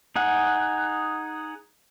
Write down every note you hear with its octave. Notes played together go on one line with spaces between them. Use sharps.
D#4 G#4 F#5